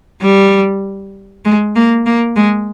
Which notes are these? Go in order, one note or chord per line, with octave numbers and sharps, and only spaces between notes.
G3
G#3
A#3
A#3
G#3